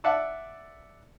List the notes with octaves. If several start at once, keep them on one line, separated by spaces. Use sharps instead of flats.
D5 E5 F#5 A5 D6